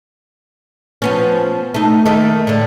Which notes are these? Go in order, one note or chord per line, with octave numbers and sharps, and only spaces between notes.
F3 B3 C#4
A3 D#4
D#3 A3 A#3
A2 D3